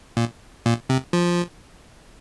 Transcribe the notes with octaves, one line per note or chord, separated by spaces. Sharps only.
A#2
A#2
C3
F3